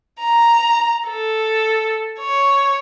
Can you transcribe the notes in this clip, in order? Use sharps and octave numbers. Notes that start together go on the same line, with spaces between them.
A#5
A4
C#5